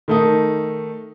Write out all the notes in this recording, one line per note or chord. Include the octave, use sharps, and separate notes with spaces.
D#3 A3 D#4